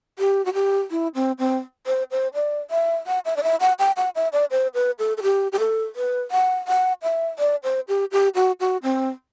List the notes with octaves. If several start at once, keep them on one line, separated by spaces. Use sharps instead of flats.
G4
F#4
G4
E4
C4
C4
C5
C5
D5
E5
F#5
E5
D5
E5
F#5
G5
F#5
E5
D5
C5
B4
A4
A4
G4
G4
A4
B4
F#5
F#5
E5
D5
C5
G4
G4
F#4
F#4
C4